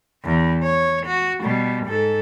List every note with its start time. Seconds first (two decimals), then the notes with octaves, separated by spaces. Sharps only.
0.25 E2
0.63 C#5
1.06 F#4
1.43 B2 G3
1.85 G#2 A4